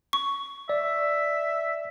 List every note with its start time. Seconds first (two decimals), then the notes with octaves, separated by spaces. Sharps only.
0.13 C#6
0.69 D5 E5